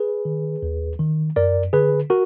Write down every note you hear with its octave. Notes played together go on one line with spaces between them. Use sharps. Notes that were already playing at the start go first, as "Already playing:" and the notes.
Already playing: G#4 B4
D#3
D#2
D#3
F#2 A#4 D5
D3 G#4 B4
F#4 A#4